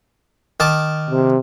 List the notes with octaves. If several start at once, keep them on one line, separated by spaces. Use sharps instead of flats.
D#3 A5 D6
C3